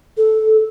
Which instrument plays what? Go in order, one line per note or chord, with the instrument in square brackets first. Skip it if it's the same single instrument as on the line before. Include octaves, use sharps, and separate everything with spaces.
[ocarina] A4